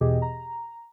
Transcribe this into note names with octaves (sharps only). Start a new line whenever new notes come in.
E2 B2 G4 G#4 D#5
A#5